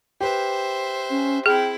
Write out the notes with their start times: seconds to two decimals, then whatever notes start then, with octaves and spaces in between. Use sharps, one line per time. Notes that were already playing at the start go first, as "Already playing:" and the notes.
0.20 G4 B4 C5 E5
1.10 C#4
1.46 C4 E4 G#4 G5